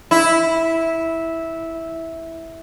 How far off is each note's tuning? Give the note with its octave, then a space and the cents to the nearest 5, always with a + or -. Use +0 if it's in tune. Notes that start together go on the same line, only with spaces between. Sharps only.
E4 -10